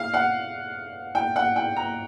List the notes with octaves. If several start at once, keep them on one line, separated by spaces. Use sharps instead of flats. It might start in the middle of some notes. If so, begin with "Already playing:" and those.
Already playing: F5
F#5
G5
F#5
G5
A#5